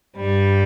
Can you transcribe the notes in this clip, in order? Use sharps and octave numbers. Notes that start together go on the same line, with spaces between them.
G2 G3